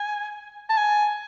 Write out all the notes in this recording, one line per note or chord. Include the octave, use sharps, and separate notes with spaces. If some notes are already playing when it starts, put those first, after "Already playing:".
Already playing: G#5
A5
G#5